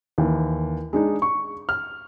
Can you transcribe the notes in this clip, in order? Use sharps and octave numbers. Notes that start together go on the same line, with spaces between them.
D#2 E3
G#3 D4 D#4
C#6
F6